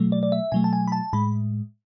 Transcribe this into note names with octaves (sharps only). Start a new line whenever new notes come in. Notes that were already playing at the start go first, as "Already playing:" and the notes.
Already playing: B2 F#3 A3
D5
D5
E5
B2 F#3 A3 G#5
A5
G#5
B5
A5
A2 G#3 B5